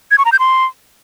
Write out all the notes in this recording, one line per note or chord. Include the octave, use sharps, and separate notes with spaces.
G#6
C#6
A#5
G6
C6